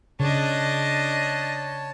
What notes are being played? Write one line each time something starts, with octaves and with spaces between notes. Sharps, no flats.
C#3 D4 C#5 D#5 A5